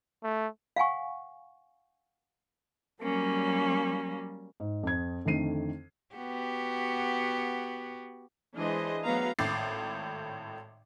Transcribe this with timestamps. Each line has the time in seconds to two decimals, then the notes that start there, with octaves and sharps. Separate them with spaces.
0.23 A3
0.76 F5 F#5 G#5 C#6
3.02 F#3 G3 A#3 C#4
4.60 G#2
4.83 F2 G#6
5.25 F2 D3 D#3 A3 C7 D#7
6.15 B3 F#4 G4
8.55 E3 G#3 D4 G#4 C5 D#5
9.04 F#3 A3 B3 B4 F5 A#5
9.39 G#1 A2 D6 A6 C7